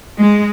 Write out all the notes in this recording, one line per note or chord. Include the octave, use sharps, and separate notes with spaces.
G#3